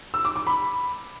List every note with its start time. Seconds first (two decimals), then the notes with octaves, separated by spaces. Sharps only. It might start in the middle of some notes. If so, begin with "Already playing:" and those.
0.14 E6
0.25 D6
0.36 D6
0.47 B5